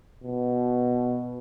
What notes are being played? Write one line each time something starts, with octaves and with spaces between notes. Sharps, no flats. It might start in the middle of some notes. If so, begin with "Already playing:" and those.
B2